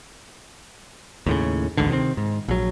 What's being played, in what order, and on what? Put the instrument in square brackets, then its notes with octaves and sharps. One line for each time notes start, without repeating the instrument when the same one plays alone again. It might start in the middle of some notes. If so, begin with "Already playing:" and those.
[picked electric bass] D#2 A2 C#3
A1 D2 G#2 D3
C3 D#3 G#3 C4
G#2
A#1 F#3